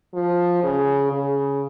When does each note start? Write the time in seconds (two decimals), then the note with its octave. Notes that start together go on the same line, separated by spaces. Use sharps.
0.15 F3
0.63 C#3
1.12 C#3